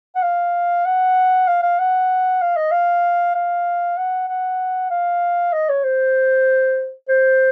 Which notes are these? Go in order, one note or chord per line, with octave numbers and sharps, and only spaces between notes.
F#5
F5
F#5
F5
F5
F#5
F5
D#5
F5
F5
F#5
F#5
F5
D#5
C#5
C5
C5